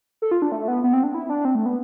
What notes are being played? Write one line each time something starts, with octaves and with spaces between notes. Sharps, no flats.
A4
F4
D4
A3
B3
B3
C4
D4
E4
D4
C4
A3
B3